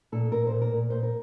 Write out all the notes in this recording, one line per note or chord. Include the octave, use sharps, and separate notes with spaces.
A#2 A4
A#2 A#4
C5
A#2
A#4
A#2
A#2 C5
A#4